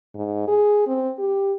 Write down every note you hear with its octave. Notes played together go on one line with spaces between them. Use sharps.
G#2
G#4
C4
G4